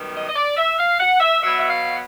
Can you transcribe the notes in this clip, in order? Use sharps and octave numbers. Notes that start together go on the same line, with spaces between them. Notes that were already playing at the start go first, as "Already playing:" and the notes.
Already playing: F#2 D#3 G3 B3
D#5
D#5
D5
E5
F5
F#5
E5
B2 F#3 B3 E5
E5
F5